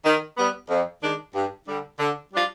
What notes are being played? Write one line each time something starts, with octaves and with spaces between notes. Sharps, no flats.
D#3
G3 B3
F2
D#3 G#3 D4
G2
D3 G3
D3
G3 D4 F4